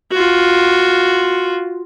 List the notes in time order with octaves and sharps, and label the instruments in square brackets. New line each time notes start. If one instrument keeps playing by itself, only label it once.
[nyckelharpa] F4 F#4